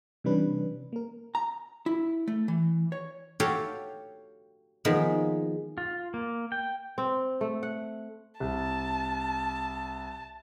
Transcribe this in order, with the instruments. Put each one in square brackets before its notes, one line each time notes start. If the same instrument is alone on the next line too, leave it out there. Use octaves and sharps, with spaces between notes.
[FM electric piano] C3 E3 G3 C#4 D4 B4
A#3 A#4
[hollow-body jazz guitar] A#5
E4
A3
E3
C#5
[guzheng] F#4 G4 A4 C#5 F5 G5
D#3 F3 G#3 A#3 B3
[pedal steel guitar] F4
A#3
G5
[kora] C4
A3
F#5
[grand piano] C2 [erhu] A5